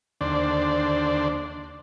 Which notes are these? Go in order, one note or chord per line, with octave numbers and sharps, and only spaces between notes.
D#2 D3 D4 C5 D5